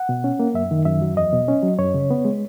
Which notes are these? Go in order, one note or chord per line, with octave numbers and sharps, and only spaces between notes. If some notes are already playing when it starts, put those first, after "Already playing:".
Already playing: F#5
B2
C#4
A#3
F#2 E5
D#3
F#2 E5
F#3
E2 D#5
B2
C#4
F#3
F#2 C#5
C#3
B3
G#3